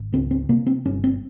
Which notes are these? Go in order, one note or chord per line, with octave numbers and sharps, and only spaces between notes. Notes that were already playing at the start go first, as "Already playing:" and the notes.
Already playing: G#1
C#2 C4
C4
C3 A#3
C4
G1 C#4
C4